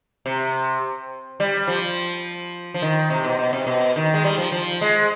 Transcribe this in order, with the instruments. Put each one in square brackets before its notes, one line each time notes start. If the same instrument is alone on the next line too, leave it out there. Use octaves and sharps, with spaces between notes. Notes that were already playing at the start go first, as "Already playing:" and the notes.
[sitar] C3
G3
F3
F3
D#3
C3
B2
B2
C3
B2
D#3
G#3
G3
F3
F3
G#3